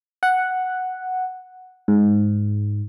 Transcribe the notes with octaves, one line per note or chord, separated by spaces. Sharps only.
F#5
G#2